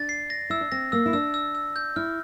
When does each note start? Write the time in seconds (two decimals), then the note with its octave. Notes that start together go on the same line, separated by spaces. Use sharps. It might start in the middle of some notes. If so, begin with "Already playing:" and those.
Already playing: D4 A6
0.09 C7
0.30 A#6
0.50 E4 E6
0.61 D4
0.72 C4 A#6
0.92 A#3 E6
1.06 E4
1.13 D4 E6
1.34 E6
1.55 E6
1.76 G6
1.96 E4 F6